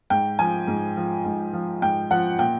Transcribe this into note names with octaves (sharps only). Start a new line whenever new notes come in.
G#2 G5
F3 G#5
G#2
F3
G#2
F3
G#2 G5
F3 F#5
A#2 G5